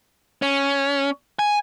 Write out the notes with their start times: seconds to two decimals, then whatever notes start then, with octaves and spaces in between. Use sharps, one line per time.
0.42 C#4
1.39 G#5